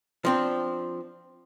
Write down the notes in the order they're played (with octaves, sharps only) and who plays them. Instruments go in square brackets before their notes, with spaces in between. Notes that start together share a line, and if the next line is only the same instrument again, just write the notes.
[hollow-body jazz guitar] F3 C4 D4